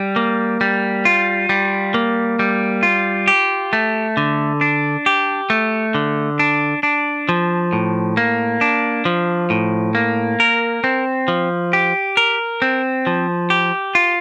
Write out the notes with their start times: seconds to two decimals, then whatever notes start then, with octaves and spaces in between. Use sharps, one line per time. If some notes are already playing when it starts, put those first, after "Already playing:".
Already playing: G3
0.16 A#3
0.61 G3
1.05 F4
1.49 G3
1.94 A#3
2.39 G3
2.83 F4
3.28 G4
3.73 A3
4.17 D3
4.61 D4
5.06 G4
5.50 A3
5.95 D3
6.39 D4
6.83 D4
7.29 F3
7.73 A2
8.17 A#3
8.61 D4
9.05 F3
9.50 A2
9.95 A#3
10.40 A#4
10.84 C4
11.28 F3
11.73 G4
12.17 A#4
12.62 C4
13.07 F3
13.50 G4
13.95 F4